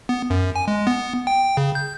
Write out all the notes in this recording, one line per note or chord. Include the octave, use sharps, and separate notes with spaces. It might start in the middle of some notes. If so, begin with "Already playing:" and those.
B3
F#2
G#5
G#3
B3
G5
C#3
G6